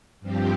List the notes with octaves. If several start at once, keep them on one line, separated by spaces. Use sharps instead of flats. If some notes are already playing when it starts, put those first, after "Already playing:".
G2 F3 C4 G4